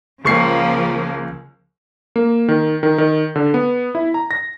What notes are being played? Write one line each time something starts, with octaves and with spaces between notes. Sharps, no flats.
C#2 C#3 F3 A#3 C#6 C7
A#3
D#3
D#3
D#3
D3
B3
E4
A#5
A#6